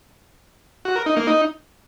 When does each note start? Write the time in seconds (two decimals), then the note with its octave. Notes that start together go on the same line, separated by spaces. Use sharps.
0.85 F#4
0.96 A#4
1.06 D#4
1.17 A#3
1.27 D#4